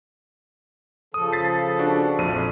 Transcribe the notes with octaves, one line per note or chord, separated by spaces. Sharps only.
C#3 F3 A4 D#6
A6 B6 C7
D4 F#4
A#1 F2 D#7